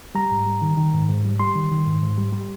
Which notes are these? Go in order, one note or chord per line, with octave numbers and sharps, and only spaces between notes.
G3 A#5
G#2
G3
D#3
D#3
G#2
G#2
G3
G3 C6
D#3
D#3
G#2
G#2
G3
G3